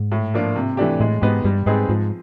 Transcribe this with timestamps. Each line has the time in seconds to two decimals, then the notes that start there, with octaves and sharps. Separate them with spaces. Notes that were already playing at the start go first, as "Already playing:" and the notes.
Already playing: G#2
0.12 A2
0.34 F3 A#3 D4 F4
0.56 C3
0.77 E3 A3 D4 G4
1.00 A2 G#3
1.22 G#2 B3 D#4 G4
1.44 G2 G3
1.66 G#2 C4 D#4 G#4 B4
1.88 G#2 F3